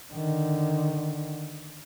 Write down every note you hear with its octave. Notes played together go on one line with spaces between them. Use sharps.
D3 D#3